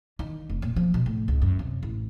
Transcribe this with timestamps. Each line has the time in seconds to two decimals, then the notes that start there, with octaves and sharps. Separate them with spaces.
0.19 D#3
0.50 F1
0.62 A#2
0.76 F3
0.94 B2
1.06 A2
1.28 C#2
1.42 F#2
1.59 C3
1.83 A1